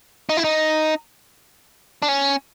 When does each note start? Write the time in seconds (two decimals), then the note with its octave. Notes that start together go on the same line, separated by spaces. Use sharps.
0.29 D#4
0.37 E4
0.44 D#4
2.02 D4
2.08 C#4